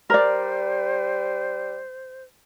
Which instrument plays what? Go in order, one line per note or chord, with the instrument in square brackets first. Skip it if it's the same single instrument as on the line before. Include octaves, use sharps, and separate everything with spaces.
[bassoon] G3 [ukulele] A#4 D5 [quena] C5